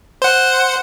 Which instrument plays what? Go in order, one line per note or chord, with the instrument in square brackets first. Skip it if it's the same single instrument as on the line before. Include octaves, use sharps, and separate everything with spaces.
[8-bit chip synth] C5 F#5